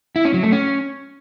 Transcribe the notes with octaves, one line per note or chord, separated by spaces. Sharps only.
E4
C#4
F#3
A3
C#4